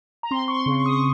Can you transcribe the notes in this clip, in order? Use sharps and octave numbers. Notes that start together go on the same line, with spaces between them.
A#5
C4 C6
C#6
C6
C#3
C#6
D#6
C#6